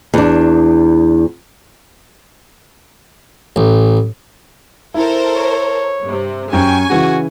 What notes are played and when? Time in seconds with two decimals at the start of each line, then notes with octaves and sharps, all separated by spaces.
0.14 E2 D4
3.56 A1
4.94 E4 A4 A#4 C5
5.36 C#5
6.03 G2 C3
6.53 F#2 G5 G#5 C#6
6.90 C#3 E3 F#4